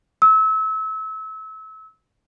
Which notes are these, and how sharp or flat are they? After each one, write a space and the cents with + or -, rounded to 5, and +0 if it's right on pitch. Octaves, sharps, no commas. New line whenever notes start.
E6 -30